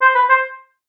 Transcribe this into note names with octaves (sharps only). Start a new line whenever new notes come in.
C5
B4
C5